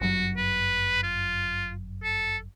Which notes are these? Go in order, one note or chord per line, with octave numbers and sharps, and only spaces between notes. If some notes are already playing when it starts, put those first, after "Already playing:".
G1 F#2 F#3 F#4
B4
F4
A4